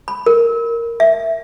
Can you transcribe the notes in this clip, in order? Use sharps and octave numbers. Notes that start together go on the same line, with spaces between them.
B5
A#4
E5